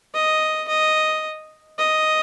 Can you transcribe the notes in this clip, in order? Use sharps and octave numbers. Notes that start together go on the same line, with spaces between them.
D#5
D#5
D#5